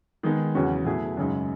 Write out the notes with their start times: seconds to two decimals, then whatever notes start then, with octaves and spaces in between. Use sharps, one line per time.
0.23 D#3 G#3 B3 D#4 G#4
0.55 E2 C#3 F#3 C#4 F#4
0.85 B2 F#3 A3 E4 G#4
1.17 F#2 C#3 G#3 D#4